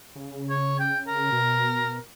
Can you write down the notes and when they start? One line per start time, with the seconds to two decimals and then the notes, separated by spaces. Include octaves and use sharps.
0.16 C#3
0.50 C#5
0.80 G5
1.08 A#4
1.32 B2